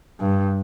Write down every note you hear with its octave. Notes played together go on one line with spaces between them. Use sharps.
G2